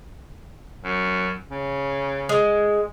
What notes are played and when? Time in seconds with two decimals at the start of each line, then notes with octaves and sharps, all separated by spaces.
0.84 F#2
1.50 C#3
2.29 G#3